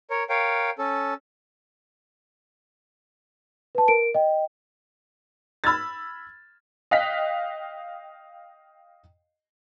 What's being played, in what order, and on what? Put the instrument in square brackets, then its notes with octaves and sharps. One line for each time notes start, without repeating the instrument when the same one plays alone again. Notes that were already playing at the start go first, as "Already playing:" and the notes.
[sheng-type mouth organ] A#4 C#5
A#4 C#5 F5 G5
C#4 A4
[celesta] B4 A5
A#4 D7
D#5 G5
[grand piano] B5 E6 F6 G#6 A6
[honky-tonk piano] D#5 F5 G5 F#6 B6